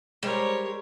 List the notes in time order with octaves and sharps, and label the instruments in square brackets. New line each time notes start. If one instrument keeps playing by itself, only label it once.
[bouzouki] G3 [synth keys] G#3 C5 [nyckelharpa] A#4 C#5